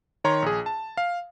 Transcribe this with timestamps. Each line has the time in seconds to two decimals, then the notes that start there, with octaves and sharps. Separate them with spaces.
0.24 D#3 C#5 A#5 C6
0.42 A#1 G#4
0.66 A5
0.97 F5